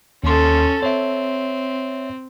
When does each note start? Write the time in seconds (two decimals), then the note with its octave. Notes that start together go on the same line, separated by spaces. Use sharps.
0.24 D#2 C#4 A4 C6
0.83 C4 C#5 E5